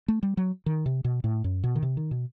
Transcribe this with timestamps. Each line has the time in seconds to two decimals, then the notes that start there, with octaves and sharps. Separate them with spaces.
0.08 A3
0.23 G3
0.37 F#3
0.66 D#3
0.86 C3
1.04 B2
1.24 A2
1.44 F#2
1.64 B2
1.75 D#3
1.83 C3
1.97 D#3
2.11 B2